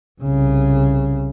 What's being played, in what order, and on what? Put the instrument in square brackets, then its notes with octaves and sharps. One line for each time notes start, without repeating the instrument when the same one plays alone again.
[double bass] C2 C#3